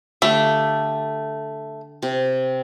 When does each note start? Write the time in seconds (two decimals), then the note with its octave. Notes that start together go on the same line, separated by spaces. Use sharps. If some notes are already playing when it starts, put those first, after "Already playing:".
0.22 D3 A3 G4 F5
2.02 C3